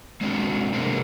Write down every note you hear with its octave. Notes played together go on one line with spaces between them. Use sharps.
G#3 C4 D4 F4 F#4
C3 G#3 A#3 C4 D4